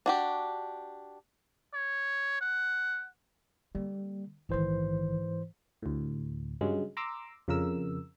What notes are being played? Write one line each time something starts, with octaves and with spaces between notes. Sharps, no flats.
D4 F#4 G4
C#5
F#5
D3 G3 A#3
A#1 G#2 D#3 E3 C5
D2 A2
G2 C#3 F#3 G#3
A#5 C6 D6 E6
F2 C#3 A#4 E6